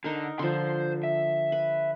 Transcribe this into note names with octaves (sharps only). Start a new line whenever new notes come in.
D3 D#4 A#4
D3 F3 C5 C6
E5
B4